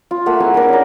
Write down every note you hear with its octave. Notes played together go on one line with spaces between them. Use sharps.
F4
A3 A#3 F#5
E4 G#4 F#5 G#5
A#3 D4 A#4 D5
C#4 A#4